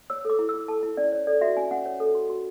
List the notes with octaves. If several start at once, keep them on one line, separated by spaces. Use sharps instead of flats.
C#5 E6
A4 D6
E4
E6
E4
A4 A5
E4
C#4 D5
C#5
A4 D5
F#4 E5
C#4 G#5
C#4 F#5
C#5
A4
F#4
F#4